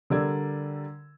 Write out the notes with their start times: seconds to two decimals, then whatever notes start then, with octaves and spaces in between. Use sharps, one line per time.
0.10 D3 G3 A#4 D5 E6 G#6